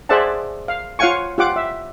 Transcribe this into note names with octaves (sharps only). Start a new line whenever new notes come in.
G#4 C5 D5 E5 F#5 A5
F5
F4 C#5 F5 F#5 G#5 C#6
F4 G4 F#5 D6
E5